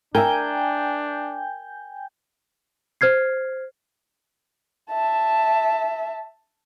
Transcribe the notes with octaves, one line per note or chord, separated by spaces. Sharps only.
D4 A#4 E5 G5 G#5 G6
C5 F6 G#6 C7
E5 A5